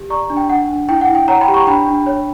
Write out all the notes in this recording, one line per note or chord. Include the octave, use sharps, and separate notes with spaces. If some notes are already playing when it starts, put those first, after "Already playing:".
Already playing: G4
D5 A#5 C#6
D4
G5
D4 F#5
D4
E4 G5
F#5
E4
G5
C#5 F#5 A#5
G5 B5
G4
A#5 C#6
D4 G5 B5
D4
C#5